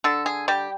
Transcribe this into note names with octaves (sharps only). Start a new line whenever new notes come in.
D3 A4
G#4
G3 G4